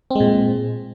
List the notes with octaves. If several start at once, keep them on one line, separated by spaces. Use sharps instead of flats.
A#2 G#3 C4